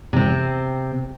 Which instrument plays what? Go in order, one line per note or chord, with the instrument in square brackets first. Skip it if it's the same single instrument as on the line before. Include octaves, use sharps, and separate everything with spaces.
[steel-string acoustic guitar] C3 C4